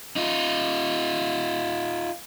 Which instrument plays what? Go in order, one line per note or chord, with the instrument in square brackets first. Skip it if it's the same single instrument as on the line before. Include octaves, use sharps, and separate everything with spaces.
[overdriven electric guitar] D#4 F4